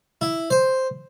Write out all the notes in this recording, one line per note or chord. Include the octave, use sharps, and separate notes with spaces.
E4
C5